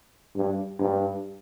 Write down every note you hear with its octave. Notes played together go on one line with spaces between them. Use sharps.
G2
G2